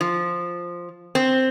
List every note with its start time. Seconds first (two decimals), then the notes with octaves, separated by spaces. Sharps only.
0.01 F3
1.15 C4